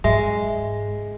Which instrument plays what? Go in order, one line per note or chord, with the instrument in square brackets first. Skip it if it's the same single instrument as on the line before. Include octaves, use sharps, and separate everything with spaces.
[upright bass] G#2 [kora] G#3 [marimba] E5